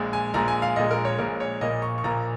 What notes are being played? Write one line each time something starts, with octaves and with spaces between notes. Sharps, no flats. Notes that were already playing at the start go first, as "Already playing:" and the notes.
Already playing: A#1 A#2 G#3
G#5
A#1 A#2 G#3 A#5
G#5
F5
A#1 A#2 G#3 D#5
A#4
C#5
A#1 A#2 G#3 A#4
C#5
A#1 A#2 A#3 D#5
C#6
C#6
A#1 A#2 A#3 A#5